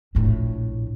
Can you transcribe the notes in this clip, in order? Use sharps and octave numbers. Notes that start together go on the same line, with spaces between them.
A#1 A2